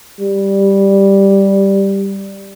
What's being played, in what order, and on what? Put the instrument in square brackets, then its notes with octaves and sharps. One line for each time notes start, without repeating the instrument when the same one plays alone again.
[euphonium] G3